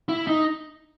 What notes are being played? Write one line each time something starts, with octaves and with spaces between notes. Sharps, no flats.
E4
D#4